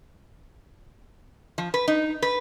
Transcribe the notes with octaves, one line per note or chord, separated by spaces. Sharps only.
F3
B4
D#4
B4